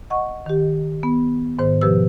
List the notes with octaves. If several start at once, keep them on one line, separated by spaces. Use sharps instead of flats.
D#5 F#5 C#6
D#3 G4
B3
G#2 D#3 C5
B2 F3 G4 B4 E6